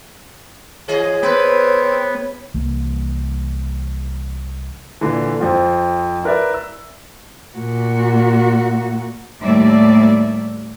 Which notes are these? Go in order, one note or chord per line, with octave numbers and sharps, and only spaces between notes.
E3 G#4 C#5 D#5
B3 C4 B4
C2 E3 A#3
A#2 D3 E3
F2 C4 F4
E4 A#4 B4 D5 E5
E6
A#2 F#4
D#2 A2 G3 A#3 D5 E5